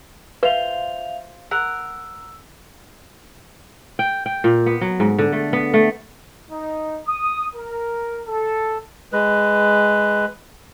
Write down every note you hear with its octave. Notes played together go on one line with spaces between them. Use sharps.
F4 B4 C5 E5 F5 F7
A#4 F#5 E6
G5
G5
A#2
B3
F#3
G#2
D3
A3
B3
A3
D#4
D#6
A#4
A4
G#3 B4